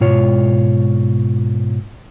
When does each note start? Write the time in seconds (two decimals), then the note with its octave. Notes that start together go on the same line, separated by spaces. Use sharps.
0.01 G#2 B2 F4 C#5